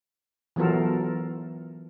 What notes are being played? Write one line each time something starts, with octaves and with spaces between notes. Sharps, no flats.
E3 F#3 B3 F4 A4 A#4